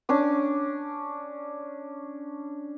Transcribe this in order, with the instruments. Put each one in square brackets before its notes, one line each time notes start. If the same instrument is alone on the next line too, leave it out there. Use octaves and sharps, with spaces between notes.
[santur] C#4 D4 D6